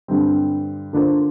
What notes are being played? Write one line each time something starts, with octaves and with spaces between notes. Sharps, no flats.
G2 D3 G3 C4
D3 A#3 D4 F4 C5